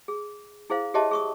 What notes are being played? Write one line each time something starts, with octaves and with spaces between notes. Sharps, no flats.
G#4
E4 G#4 C5 F5
G4 G#4 C#5 D#5 E5 A5
G#4 C#6 D#6